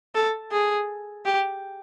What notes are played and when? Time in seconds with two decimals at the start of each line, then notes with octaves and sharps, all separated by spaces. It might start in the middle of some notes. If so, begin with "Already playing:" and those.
0.15 A4
0.52 G#4
1.25 G4